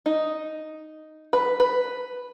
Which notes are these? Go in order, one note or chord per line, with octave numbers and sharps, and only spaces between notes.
D#4
B4
B4